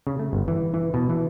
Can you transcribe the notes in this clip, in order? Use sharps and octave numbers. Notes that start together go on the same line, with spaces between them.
C#3
A3
G1
E3
E3
B2
E3